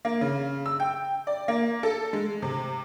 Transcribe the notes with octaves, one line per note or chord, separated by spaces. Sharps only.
A#3
C#3
E6
G5
D5
A#3
A4
G#3
C3